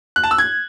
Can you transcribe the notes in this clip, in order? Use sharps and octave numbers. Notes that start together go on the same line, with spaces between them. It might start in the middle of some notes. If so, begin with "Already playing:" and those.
F#6
A5
E6
G#6